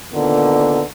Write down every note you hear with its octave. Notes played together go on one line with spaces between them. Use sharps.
A#2 D3 D#3 B3